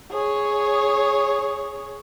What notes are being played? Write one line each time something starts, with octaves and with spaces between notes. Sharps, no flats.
G#4 C#5